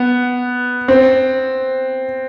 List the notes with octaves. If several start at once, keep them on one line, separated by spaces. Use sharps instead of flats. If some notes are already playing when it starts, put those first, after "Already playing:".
Already playing: B3
C4